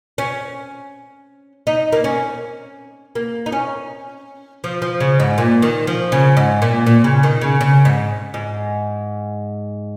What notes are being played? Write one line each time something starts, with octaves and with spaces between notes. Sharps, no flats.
C#4
D#4
A#3
C#4
A#3
D#4
C#4
F3
F3
C#3
G#2
A#2
D#3
F3
C#3
G#2
A#2
A#2
C#3
D#3
C#3
C#3
G#2
G#2